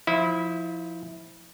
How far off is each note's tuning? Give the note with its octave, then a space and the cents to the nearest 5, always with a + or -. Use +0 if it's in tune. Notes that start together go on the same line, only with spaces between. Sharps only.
F3 +0 E4 -10 D#5 +45